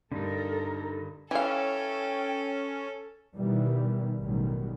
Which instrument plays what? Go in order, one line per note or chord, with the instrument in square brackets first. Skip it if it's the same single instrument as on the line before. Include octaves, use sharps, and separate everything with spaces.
[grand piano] G2 [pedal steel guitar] D3 D#4 [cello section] A4 A#4
[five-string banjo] E3 F5 [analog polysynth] C#4 [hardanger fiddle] A4 [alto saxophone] G5
[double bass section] B2 D#3 E3 G3
A1 F#2 B2 D#3 G3